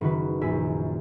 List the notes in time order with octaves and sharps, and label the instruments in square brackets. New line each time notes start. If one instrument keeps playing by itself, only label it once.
[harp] F#1 D#3 F#4 B4
A#1 F#2 G#5 E6 B6